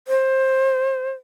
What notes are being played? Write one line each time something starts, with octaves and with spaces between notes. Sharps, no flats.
C5